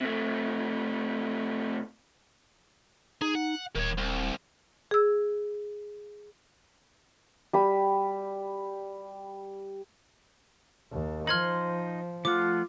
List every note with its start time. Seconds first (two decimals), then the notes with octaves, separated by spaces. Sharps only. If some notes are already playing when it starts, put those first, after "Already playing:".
0.01 C3 A3
3.22 D#4 G#4
3.35 F#5
3.76 D#1 D#3 C#5
3.98 C2
4.91 G#4 E6
7.53 G3 B5
10.91 D#2
11.27 F3 D#4 C5 C6 F6 G#6 F#7
12.25 F3 A3 F4 F#5 D6